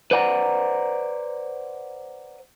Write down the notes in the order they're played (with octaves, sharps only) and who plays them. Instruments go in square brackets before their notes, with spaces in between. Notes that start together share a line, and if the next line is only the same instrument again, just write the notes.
[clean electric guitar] B4 C5 D5 F#5 A5 A#5